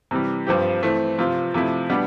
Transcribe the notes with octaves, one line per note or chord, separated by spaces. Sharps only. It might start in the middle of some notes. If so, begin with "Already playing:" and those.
C3 E3 G3
G2 F3 C4 G4
E3 A3 C4
C3 F3 C4 F4
C3 F3 A3 E4
B2 G3 B3 D4